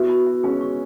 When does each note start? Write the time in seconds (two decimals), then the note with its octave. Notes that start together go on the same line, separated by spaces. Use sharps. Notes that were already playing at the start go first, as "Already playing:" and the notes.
Already playing: B3 E4 F#4
0.10 B5
0.27 E5
0.43 G#3 C#4 G#4
0.61 C#6